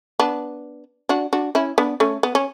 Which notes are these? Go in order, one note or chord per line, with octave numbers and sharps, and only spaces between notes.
B3 D4
D4 F#4
D4 F#4
C#4 E4
B3 D4
A3 C#4
B3
C#4